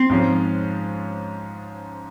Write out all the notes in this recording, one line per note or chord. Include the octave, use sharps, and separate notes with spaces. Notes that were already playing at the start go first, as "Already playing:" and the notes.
Already playing: C4
G#2 F3 G#3 C#4